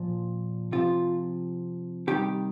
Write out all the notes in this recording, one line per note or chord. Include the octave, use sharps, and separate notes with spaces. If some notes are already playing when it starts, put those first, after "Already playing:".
Already playing: A#2 F3
C3 F3 F4
C3 D#3 G3 G4